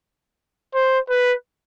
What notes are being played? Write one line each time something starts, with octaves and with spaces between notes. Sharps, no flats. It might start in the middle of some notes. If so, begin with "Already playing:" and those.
C5
B4